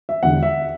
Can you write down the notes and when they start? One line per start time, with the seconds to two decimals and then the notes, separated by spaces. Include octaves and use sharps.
0.09 E5
0.22 E1 E2 D3 F#5
0.43 E5